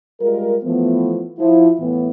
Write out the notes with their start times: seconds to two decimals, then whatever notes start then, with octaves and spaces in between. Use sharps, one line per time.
0.20 G3 G#3 F4 A#4
0.64 E3 F3 A3 B3
1.39 F3 E4
1.80 A2 E3 B3